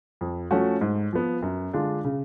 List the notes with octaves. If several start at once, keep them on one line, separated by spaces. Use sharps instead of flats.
F2
F3 A3 C#4 F#4
G#2
F3 B3
F#2
D3 G#3 D4 F4
C#3